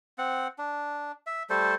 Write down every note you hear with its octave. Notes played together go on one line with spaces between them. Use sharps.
C4 F#5
D4
E5
G3 A3 A4 C5